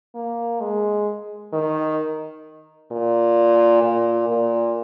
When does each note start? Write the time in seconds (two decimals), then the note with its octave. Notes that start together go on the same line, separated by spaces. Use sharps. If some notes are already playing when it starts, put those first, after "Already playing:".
0.15 A#3
0.61 G#3
1.53 D#3
2.91 A#2
3.83 A#2
4.29 A#2